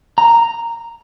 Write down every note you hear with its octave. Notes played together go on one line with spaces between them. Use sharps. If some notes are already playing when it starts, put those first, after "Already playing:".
A#5